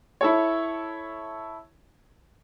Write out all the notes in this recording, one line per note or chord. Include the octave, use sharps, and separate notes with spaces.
E4 A4 C#5